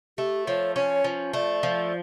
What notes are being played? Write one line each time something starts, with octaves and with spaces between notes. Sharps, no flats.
A3 G4
F3 C#5
C#4 C#5
F3
A3 D5
F3